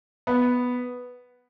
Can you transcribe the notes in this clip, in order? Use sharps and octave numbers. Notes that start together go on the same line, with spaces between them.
B3